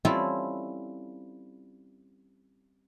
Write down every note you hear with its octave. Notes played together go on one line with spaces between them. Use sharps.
G3 C4 C#4 E4 F4 A4